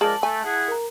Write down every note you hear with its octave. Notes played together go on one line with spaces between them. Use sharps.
F3 G#3 G#4 A#4 D5 A5 F#7
A3 G#5
E4 G#4 F#5
A#4 A#5